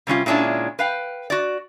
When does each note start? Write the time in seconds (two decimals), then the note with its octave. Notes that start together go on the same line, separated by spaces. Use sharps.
0.07 C3 G3 C#4 F4
0.26 A#2 G#3 C#4 D4 E4
0.79 B4 F5 G5
1.30 F#4 D5